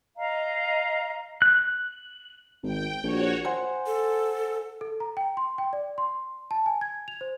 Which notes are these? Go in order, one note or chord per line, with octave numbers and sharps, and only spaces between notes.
D#5 F5 A#5
F#6
G#1 G5
A#1 F#4 C#5
C5 F#5 G#5
A4
A4
A#5
G5
C6
G5
D5
C6
A5
G#5
G#6
F7
C5